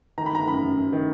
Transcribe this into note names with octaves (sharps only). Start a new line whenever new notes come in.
D#3 A#5
B5
G1 A#5
F#2 B5
F#2
F#2
D#3